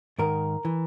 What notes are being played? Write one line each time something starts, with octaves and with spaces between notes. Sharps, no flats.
G#2 D#3 A#4
E3